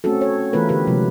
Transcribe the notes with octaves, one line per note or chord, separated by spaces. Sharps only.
A3 C4 C#4 F#4 A4
C#5
E3 A3 B3 F4 A#4 B4
D3 G4 B4
C3 F3 F#3 G#3